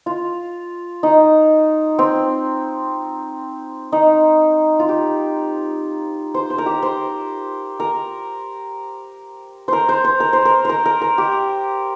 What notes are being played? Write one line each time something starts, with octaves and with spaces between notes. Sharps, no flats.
F4
D#4
C4
D#4
F4
G4
C5
C5
A#4
G4
C5
A#4
A#4 C5
C5
C5
A#4
C5
A#4
A#4 C5
A#4
A#4
G4